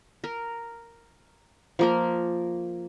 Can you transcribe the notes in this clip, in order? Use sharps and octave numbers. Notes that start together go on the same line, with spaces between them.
A#4
F3 A#3 A#4